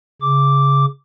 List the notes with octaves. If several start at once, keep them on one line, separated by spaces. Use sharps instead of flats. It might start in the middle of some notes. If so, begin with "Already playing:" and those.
C#3 D6